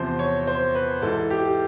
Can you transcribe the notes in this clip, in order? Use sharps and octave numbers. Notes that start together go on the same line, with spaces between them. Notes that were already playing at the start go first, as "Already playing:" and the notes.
Already playing: E2 C3 F3 C5
C#5
C5
B4
G#2 E3 A4
G4